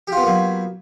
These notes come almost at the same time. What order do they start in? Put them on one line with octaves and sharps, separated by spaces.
G4 F4 B3 A#3 F#3